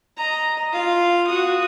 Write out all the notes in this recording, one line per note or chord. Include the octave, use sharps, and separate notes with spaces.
D#5 A#5
F4 F5
F#4 D#6